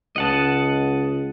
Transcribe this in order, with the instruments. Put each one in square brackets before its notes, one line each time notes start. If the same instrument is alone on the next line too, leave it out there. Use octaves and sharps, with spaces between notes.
[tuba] C#2 [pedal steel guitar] D#5 F#5 A5